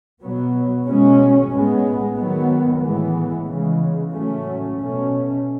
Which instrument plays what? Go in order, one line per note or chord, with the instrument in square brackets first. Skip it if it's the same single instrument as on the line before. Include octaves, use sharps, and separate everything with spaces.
[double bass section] B2 F#3 B3
B2 G#3 C#4
A2 G#3 B3
D#3 F#3 B3
A2 E3 G#3 B3
C#3 E3 G#3
A2 F#3 A3 C#4
B2 A3 C#4